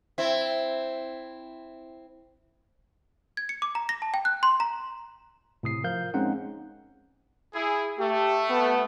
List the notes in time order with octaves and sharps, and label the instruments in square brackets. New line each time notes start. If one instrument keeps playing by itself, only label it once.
[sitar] C4 E4
[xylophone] G#6
C#7
D6
A#5
A#6
A5
G5
F#6
C6
A#5
[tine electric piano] A2 C3 D#6 C7
F3 A#4 F5 G6
G#3 C4 C#4 D#4 F#5
[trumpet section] E4 G#4
[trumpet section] A3 [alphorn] G4
[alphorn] B3